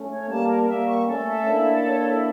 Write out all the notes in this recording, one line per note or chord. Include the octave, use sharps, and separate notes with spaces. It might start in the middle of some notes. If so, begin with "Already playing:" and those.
Already playing: A3 C#4
C#5
G3 A#3 A5
A#4
G3 A#3 E5
C#6
A3 C#4 A4
E5
A#3 D4 E4
A4
C#5
E4